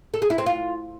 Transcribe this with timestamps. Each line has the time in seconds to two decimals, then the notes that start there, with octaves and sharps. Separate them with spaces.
0.14 A4
0.22 G#4
0.30 E4
0.38 C4
0.46 F4